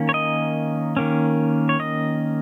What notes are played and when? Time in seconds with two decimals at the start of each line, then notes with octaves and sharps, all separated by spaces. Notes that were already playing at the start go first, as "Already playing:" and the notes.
Already playing: D#3 A#3 C#4
0.09 C#5
0.14 D#5
0.97 D#3 A#3 C#4
1.69 C#5
1.80 D#5